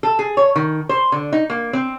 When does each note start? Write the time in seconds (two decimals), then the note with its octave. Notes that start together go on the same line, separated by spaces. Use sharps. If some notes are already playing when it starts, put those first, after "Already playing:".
0.03 A4
0.19 G#4
0.37 C#5
0.56 D#3
0.89 C5
1.12 D3
1.32 D#4
1.50 A#3
1.73 C4